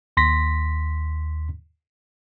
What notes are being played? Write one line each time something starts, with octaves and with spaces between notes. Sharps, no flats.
D#2 C6 A#6 B6